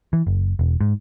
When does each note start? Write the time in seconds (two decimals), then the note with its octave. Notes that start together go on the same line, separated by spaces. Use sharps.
0.13 E3
0.27 F#1
0.59 E1
0.81 G#2